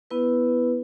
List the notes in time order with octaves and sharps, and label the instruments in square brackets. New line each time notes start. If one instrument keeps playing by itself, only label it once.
[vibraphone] B3 E4 B4